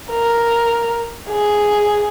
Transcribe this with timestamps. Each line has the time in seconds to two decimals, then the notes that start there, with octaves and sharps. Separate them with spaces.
0.10 A#4
1.30 G#4